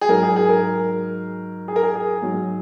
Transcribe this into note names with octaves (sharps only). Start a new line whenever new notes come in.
G#4
G#2 F#3 A#4
G#4
G#4
A#4
G#4
A#4
G#4
G#4
G#2 F#3